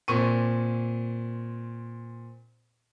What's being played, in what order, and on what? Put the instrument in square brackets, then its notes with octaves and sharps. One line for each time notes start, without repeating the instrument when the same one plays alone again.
[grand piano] A#2 C4 C#6 D#7